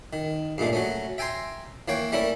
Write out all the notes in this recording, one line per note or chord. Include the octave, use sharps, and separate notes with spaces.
D#3
G2 A#2 G#3 A3
F#3 A3 C#4
E5 G5 G#5 A#5 C6
E3 A#3 C#5 G5
G3 A3 C#4 E4 A#4